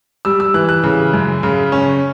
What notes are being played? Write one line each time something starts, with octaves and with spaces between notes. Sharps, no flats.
G3 E6
E6
E3 F#6
F#6
C#3
F#2
C#3
C#4